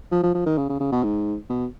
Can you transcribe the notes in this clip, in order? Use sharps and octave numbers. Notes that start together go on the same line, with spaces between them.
F3
F3
F3
D#3
C#3
C#3
C#3
B2
G#2
B2